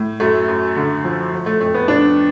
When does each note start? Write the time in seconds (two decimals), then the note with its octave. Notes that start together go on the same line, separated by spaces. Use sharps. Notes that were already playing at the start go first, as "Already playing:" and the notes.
Already playing: A2
0.20 F#2 A3
0.48 F#2
0.76 D3
1.04 F3
1.32 F3
1.46 A3
1.61 F2 A3
1.74 B3
1.88 F3 D4